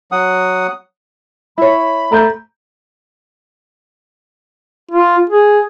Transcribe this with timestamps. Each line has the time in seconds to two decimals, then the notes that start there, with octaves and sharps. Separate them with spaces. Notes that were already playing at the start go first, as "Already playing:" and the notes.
0.12 F#3 F#5 D#6
1.58 E4 C#5 B5
2.12 A3 A#5 G6
4.91 F4
5.30 G#4